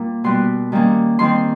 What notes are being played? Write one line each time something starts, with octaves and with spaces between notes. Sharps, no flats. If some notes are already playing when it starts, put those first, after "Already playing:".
Already playing: A#2 G3 A#3
B2 G3 B3 C6
D#3 G3 A#3 C#4
D#3 G3 C4 C6